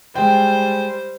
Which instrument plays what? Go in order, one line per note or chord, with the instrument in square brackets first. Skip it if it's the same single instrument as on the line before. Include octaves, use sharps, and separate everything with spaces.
[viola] G3 C5 [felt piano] G#3 G5